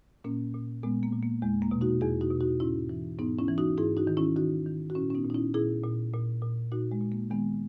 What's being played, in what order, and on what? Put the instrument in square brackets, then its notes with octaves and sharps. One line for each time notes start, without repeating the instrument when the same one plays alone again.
[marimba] A#2 A#3 C#4
A#2
A#2 G#3 B3
A#3
A#2
A#3
E2 G#3
A#3
B2
D#4 F#4
E2 E4 G#4
D#4 F#4
B2
D#4 F#4
G#2 C#4 E4
E3
G#2 B3 D#4
C#4 E4
E3
D#4 F#4
G#2 E4 G#4
D#4 F#4
D#3
C#4 E4
D#3 D#4 F#4
D#3
F#4
A#2 C#4 E4
C#4
B3 D#4
A#2
D#4
C#4 E4
A#2 E4 G#4
A#2
A#2
A#2
A#2 D#4 F#4
G#3
A#2
A#3
D#3 G#3 B3